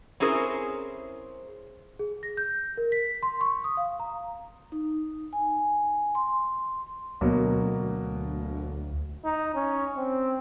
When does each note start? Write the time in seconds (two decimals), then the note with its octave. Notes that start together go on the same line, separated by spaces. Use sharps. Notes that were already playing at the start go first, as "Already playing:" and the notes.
0.20 C4 C#4 E4 G#4 A#4 C5
1.99 G#4
2.23 A#6
2.37 G6
2.77 A#4
2.92 B6
3.23 C6
3.41 C#6
3.64 D#6
3.77 F5
4.00 A#5
4.72 D#4
5.33 G#5
6.15 C6
7.21 D2 B2 F#3 A#3
9.25 D#4
9.55 C#4
9.97 C4